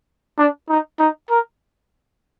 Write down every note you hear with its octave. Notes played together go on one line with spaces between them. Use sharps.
D4
D#4
D#4
A#4